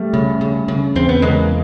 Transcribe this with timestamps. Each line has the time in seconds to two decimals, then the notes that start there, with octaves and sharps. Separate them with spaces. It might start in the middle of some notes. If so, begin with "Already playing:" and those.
Already playing: G3 A3
0.14 C#3
0.41 C#3
0.68 C#3
0.95 E2 C4
1.09 B3
1.22 C#3 G#3 A#3